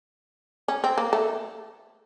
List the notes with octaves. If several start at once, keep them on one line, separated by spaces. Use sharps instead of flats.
C#4
C4
A#3
A3